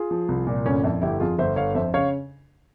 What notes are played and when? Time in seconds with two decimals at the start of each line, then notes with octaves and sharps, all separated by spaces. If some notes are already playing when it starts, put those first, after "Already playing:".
Already playing: F4 G#4
0.11 F3
0.28 C2
0.47 A#2
0.65 G1 C#4
0.84 F2 E4
1.02 G1 E4 G4
1.20 F2 F4 G#4
1.38 G1 C5 E5
1.56 G1 C#5 F5
1.75 F2 C5 E5
1.94 C#3 C#5 F5